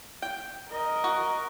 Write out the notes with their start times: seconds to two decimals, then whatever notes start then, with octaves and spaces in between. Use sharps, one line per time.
0.22 G5
0.69 A#4 D#5
1.04 F#4